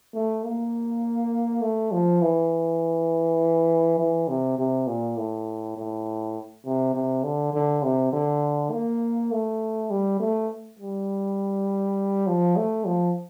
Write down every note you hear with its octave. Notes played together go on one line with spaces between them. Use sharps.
A3
A#3
A3
F3
E3
E3
C3
C3
A#2
A2
A2
C3
C3
D3
D3
C3
D3
A#3
A3
G3
A3
G3
F3
A3
F3